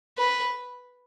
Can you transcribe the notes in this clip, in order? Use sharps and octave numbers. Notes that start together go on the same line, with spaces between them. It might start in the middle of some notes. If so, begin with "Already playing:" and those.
B4